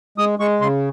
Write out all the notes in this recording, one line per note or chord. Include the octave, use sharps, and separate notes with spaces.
G#3 D#6
G#3 C#6
C#3 C6